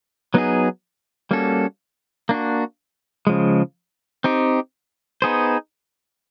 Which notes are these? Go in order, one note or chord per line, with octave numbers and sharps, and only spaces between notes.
F#3 B3 D#4 G#4
G3 A#3 C#4 F#4 A4
A#3 D4 F#4
C#3 F3 G#3
C4 D#4 G4
B3 D#4 G#4 C5